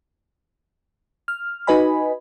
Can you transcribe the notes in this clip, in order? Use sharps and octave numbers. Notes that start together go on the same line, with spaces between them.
F6
D#4 F#4 B4 D#5 G#5 B5